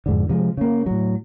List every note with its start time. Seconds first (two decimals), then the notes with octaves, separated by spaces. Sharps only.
0.06 F2 G#2 D3
0.29 C3 F3 G3 G#3
0.57 C#3 A#3
0.86 A2 F#3